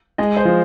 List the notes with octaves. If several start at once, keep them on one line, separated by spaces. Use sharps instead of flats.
G#3 D#5
C5
F3